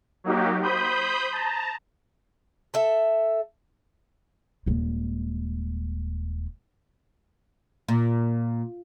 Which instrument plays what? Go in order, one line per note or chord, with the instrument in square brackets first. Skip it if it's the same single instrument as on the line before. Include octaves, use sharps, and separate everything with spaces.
[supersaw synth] F#3 A#3 D#4 F#4 G4
C5 B5 D#6 G6
A5 A#5
[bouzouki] A4 E5
[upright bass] D#1 G#3
[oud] A#2